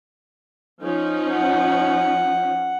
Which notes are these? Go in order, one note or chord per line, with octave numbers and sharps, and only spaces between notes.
F3 C#4 D#4
F#5